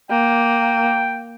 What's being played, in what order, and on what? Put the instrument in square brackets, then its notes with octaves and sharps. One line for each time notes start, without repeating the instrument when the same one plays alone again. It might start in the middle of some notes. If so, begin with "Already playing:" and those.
[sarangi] A#3 [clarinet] G5